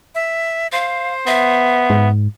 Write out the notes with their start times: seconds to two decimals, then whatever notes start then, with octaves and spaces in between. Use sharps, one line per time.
0.15 E5
0.72 C5 F5
1.27 B3 E5
1.90 G#2